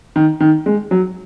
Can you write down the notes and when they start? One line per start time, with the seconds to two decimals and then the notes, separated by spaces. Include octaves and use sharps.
0.16 D#3
0.40 D#3
0.66 G#3
0.91 F#3